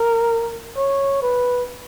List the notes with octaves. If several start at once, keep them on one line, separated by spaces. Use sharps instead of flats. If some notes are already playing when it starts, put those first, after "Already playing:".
Already playing: A#4
C#5
B4